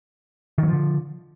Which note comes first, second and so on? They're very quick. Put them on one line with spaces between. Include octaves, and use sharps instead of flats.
D#3 F#3 F3 D3